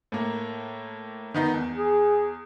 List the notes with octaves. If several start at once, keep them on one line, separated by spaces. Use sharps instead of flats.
A2 A#3
D#3 B3 D#4
E2
G#4